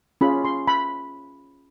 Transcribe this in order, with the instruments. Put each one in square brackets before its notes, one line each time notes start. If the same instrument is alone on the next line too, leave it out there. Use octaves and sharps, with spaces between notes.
[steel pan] C#4 F4 G#4 B5
C6
B5